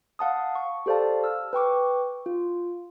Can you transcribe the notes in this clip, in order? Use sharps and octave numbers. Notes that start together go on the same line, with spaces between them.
F5 F#5 A5 D#6
C#6
G4 A4 C5 D5 F5 A5
E6 F6
B4 G5 C#6 D6
F4